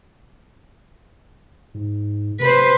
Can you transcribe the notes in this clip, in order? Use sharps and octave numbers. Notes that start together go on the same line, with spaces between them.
G#2
C3 B4 C5